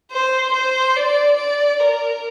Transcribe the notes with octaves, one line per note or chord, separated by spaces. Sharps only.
C5
C5
D5
D5
A#4